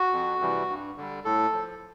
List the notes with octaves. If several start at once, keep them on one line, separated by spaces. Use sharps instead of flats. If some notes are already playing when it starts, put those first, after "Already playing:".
Already playing: F#4
F2
C3 E3 G3
G2
D3 G3
A2 A4
F3